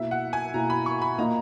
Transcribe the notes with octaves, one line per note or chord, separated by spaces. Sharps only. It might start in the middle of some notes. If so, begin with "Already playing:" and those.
Already playing: B2 A#3 E4 E5
F#5
G#5
B2 A#3 E4 A#5
B5
C#6
B5
A#2 A#3 D#4 A#5